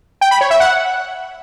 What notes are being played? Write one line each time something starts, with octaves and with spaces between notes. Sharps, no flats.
G5
B5
C#5
E5
F#5